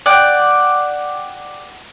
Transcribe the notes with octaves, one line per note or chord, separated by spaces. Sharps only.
D5 F#5 G5